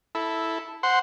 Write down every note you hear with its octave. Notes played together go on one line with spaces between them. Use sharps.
E4 A4
C5 F#5 C6